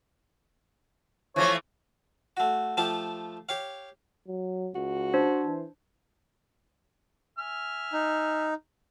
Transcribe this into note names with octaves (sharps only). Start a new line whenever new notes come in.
E3 F3 A3 C#5
A3 F#4
F3 A3 F4 G4 A5
G4 C#5 F5
F#3
C#2 F#4
D4 C5
E3
E5 G#5 F6
D#4